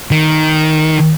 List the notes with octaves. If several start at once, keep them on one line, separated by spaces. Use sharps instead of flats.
D#3